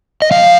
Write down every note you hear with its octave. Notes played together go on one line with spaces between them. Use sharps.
D#5
F3 F5